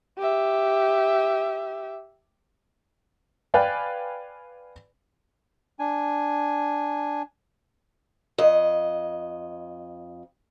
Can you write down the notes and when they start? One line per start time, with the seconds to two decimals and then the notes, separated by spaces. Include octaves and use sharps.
0.18 G4 E5
3.54 B4 D5 F5 G5 G#5
5.79 D4 G#5
8.38 F2 D#5